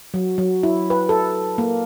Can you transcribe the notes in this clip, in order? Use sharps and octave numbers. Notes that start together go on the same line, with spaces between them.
F#3
F#3
E4
B4
A4
A#3